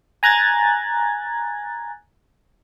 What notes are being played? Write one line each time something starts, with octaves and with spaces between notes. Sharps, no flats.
G#5 A#5 F#6 G#6 A6